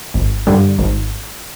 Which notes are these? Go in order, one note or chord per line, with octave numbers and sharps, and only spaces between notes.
G#1
G2 D3 G3
G#1